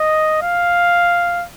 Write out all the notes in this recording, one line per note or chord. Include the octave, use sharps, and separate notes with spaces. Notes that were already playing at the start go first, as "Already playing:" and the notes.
Already playing: D#5
F5